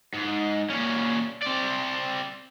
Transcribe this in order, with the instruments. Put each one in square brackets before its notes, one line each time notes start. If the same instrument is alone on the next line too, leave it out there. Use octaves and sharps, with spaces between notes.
[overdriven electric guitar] G#2
A#2 C#4
C4 D5